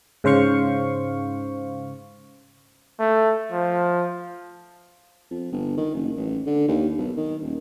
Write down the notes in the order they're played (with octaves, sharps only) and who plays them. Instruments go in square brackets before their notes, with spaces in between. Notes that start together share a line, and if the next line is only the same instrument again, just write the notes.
[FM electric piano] G#2 C#3 C5 F5 C#6
[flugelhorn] A3
F3
[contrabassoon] F2
G1
D#3
F#1
A1
D3
D#2
B1
D#3
D#1